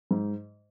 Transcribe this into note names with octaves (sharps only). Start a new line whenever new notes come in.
G#2